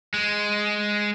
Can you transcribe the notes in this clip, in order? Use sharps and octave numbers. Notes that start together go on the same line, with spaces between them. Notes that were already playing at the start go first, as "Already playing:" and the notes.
G#3